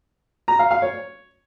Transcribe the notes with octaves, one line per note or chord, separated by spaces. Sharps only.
A#5
F5
F5
C#5